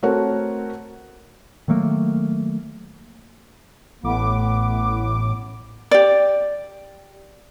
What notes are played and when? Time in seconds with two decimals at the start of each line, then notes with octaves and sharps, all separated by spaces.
0.03 A3 C4 F#4 A#4 C#5 F#5
1.68 D#3 F#3 A3 A#3
4.03 A1 A2 B3 D6
5.91 G4 D5